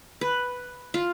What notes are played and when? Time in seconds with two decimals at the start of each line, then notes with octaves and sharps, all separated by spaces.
0.21 B4
0.94 F4